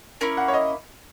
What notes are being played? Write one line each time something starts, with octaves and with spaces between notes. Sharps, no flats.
A#3 C#4 E4
F#5
C#5
D#5